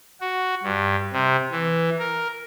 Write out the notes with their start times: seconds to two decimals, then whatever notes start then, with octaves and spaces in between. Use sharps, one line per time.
0.21 F#4
0.63 G2
1.13 C3
1.51 E3
1.99 A#4